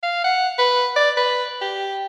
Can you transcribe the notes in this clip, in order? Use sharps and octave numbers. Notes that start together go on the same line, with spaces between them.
F5
F#5
B4
D5
B4
G4